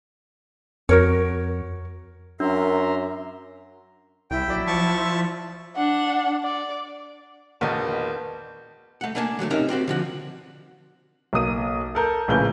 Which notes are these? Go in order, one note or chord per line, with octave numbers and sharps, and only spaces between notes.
F2 F#4 A#4 C#5
F#2 D4 A#4 E5 A#5 C6
C2 E4 G5
A#1 F#3 D5 B6
F3 A5 C#6
C6 E6
D4 F#5
D5
E1 A#1 B2 D#3 B3 A5 G6
A3 F#5
A3 A#3 D4 G#5 A5
D3 F#3 G#3 A3
C3 C#4 D#4 A#4 E5
C4 F#4 G4 C5
D3 F3 F#4
B1 A#3 D#6 D#7
A4 A#4 G6
A#1 A2 C#3 B4 G6 G7